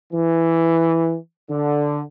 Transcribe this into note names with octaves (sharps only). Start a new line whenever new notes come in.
E3
D3